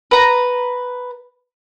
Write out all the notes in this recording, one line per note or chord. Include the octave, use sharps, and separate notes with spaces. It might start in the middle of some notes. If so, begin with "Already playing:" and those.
B4 A#5